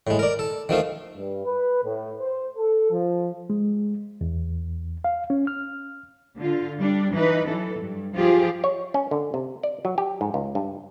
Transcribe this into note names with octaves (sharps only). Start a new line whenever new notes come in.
A2 G#3
A#4 D5
A4
D#3 F3 A3 F4
G2
B4
A2
C5
A4
F3
G#3
E2
F5
C#4
F6
D3 F4
G3 D4
E3 D#4 B4
E3 F#3 A4
G2
F3 F4 G4 G#4
C#5
C#4
D3
C3
D5
F#3
G4
G#2
C#2
G2